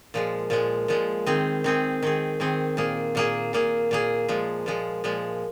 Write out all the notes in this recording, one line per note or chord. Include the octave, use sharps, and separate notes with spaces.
A#2 F3 G#3
A#2 F3 G#3
A#2 F3 G#3
D#3 C4 G#4
D#3 C4 G#4
D#3 C4 G#4
D#3 C4 G#4
A#2 A#3 G#4
A#2 A#3 G#4
A#2 A#3 G#4
A#2 A#3 G#4
A#2 F3 G#3
A#2 F3 G#3
A#2 F3 G#3